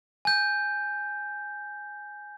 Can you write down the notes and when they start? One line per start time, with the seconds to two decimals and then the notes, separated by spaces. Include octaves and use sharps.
0.25 G#5 G6